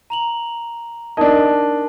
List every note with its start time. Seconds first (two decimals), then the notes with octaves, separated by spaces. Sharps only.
0.10 A#5 F7 F#7
1.17 D4 D#4 A#4 D#5 A5